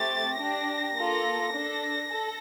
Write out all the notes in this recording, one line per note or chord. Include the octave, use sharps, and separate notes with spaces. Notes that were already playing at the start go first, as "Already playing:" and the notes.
Already playing: A3 C4 G4 A6
D4 G4 A#6
A#3 F4 A4
D4 A4
A4